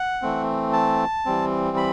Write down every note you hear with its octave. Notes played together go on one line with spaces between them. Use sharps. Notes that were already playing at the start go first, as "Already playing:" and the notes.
Already playing: F#5
E3 A3 C4
A5
E3 G3 C4
B5